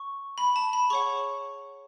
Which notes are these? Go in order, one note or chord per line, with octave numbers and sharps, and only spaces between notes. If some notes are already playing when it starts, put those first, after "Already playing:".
Already playing: C#6
B5
A5
B5
G#4 C#5 F#5 C#6